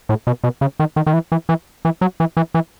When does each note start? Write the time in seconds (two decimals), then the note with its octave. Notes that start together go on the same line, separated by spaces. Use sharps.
0.09 A2
0.27 B2
0.44 B2
0.61 C#3
0.80 D#3
0.96 D#3
1.06 D#3
1.13 E3
1.32 E3
1.49 E3
1.85 E3
2.01 F#3
2.20 E3
2.37 E3
2.54 E3